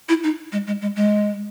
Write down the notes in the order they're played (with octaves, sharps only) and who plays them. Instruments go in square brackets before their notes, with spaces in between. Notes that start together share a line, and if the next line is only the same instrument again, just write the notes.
[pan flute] E4
D#4
G#3
G#3
G#3
G#3